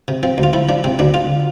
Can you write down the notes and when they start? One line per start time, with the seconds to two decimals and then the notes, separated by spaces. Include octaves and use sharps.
0.08 C3
0.23 F3 C4
0.38 D2
0.43 F4
0.53 F3 E4
0.69 F3 D4
0.84 C3 C4
0.99 D2 D4
1.14 D3 F4